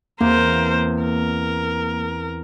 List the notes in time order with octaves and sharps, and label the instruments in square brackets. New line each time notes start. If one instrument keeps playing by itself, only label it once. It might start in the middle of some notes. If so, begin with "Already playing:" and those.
[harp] E2 C4 [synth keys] A#3 [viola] A#4 C5
[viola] A#4